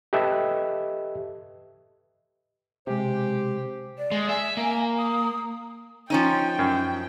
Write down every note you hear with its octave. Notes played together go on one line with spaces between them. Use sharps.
G4 A4 B4 D#5 E5
B1 C3 G#3 G4 C5
D5
G#3
E5 G#5
A#3
D#6
F3 C#4 D#4 G5
F#2